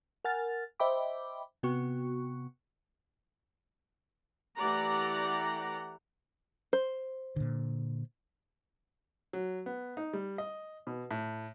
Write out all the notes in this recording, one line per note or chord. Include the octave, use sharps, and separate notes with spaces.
A#4 F#5 G#5 F6 A6
C5 D#5 E5 G5 B5 D6
C3 B3 F#4 C#6
E3 A3 G4 D5 F#5 A#5
C5
A#2 D3
F#3
B3
D#4
G3
D#5
B2
A2